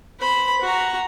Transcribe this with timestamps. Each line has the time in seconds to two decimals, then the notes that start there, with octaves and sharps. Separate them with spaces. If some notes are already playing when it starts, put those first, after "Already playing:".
0.20 C5 B5
0.61 F#4 A#5